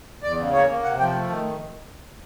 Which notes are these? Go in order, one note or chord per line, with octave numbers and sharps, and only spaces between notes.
E2 D5
C#3
A#3 C#5
A#3
C3 F#5
F3 G5
A3
D#3